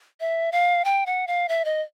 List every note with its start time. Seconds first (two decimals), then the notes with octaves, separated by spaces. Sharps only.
0.20 E5
0.52 F5
0.85 G5
1.06 F#5
1.27 F5
1.49 E5
1.65 D#5